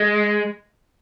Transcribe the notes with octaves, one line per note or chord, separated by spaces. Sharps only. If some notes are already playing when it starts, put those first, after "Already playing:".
Already playing: G#3